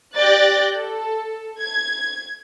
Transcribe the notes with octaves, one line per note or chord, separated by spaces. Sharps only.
G4 D5 F#6 G6 A6 A#6
A4
G#6